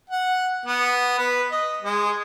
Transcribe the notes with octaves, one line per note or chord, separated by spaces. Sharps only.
F#5
B3
B4
D#5
G#3